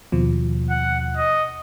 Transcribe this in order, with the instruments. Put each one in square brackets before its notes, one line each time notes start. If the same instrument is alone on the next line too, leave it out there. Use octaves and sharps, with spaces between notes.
[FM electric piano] D#2 B2 F3
[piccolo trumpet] F#5
D#5